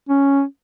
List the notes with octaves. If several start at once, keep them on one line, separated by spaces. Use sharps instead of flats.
C#4